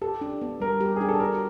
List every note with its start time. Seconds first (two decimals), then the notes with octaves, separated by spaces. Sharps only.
0.02 G4 A4
0.21 D4
0.42 B3
0.60 G3 A#4
0.81 G4
0.96 D4 G#4
1.09 A4
1.20 F#4 A#4